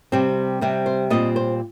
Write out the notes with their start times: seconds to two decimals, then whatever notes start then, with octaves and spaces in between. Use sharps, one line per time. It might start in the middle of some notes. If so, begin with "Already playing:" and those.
0.12 C3 G3 C4
0.61 C3 G3 C4
0.86 C5
1.10 A#2 G3 C4 D#5
1.36 C5